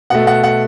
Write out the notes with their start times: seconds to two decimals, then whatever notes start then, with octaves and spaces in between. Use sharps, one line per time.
0.10 B2 A3 F#5
0.27 F#5
0.43 F#5